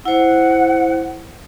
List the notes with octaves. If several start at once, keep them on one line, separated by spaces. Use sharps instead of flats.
E4 C5 F#5